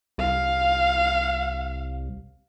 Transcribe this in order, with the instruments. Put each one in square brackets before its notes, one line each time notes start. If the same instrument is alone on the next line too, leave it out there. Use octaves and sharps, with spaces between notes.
[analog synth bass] C2 [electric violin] F5